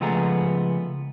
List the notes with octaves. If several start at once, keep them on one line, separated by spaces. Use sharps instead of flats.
C#2 F3 A3 B3 G#4 A#5